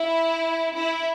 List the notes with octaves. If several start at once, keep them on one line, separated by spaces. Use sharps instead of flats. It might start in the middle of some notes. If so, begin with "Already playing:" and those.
Already playing: E4
E4